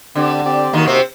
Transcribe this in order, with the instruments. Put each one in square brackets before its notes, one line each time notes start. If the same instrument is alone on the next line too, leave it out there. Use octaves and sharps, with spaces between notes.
[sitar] D3 [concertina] C4 G4 D5
[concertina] C4 G4 D5
[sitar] D#2 D#3 [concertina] A#3 D#4 F#4
[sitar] C3 C4